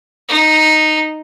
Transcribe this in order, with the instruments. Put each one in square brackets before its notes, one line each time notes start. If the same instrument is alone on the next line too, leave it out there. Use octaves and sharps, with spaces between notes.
[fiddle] D#4